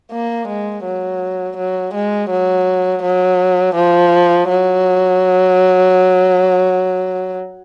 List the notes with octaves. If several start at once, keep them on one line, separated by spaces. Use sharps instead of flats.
A#3
G#3
F#3
F#3
G#3
F#3
F#3
F3
F#3